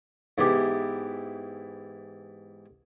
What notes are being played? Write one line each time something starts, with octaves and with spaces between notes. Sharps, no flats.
G#2 E3 B3 G4